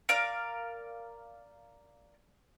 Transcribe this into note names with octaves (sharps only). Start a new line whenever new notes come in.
A#4 D5 F5